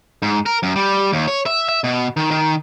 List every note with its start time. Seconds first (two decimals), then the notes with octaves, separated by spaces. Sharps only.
0.22 G#2
0.46 A#4
0.63 F#2
0.76 G3
1.12 D#2
1.28 C#5
1.46 E5
1.69 E5
1.84 B2
2.17 D#3
2.31 D#3